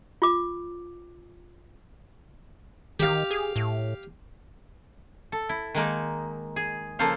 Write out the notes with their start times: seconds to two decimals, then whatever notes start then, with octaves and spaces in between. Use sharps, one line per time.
0.22 F4 D6
3.00 D#3 G4 F5
3.31 G#4
3.56 A2
5.32 A4
5.49 E4
5.74 D#3 G#3 A#3 D#4
6.56 G#4
6.99 C#3 F3 A#3 A4 C5 F5